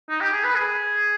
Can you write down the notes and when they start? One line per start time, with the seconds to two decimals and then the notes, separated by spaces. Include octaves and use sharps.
0.09 D#4
0.21 G4
0.33 G#4
0.44 B4
0.55 G#4